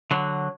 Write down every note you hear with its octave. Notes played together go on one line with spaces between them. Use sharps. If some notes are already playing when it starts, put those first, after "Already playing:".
D3 F#3